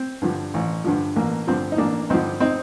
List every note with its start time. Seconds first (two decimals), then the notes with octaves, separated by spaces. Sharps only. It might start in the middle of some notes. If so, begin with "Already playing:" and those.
Already playing: C4
0.22 G2 D3 F3
0.54 A1
0.84 G2 D3 F3
1.16 A1 A#3
1.47 G2 D3 F3 C4
1.72 D#4
1.78 A1 A#3 D4
2.10 G2 D3 F3 C4 D#4
2.40 C4 D#4